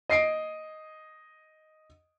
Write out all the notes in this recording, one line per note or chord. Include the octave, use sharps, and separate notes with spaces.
D#5 C7 D7